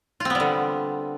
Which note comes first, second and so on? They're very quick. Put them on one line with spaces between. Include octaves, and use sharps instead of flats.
F4 C4 B3 G3 D3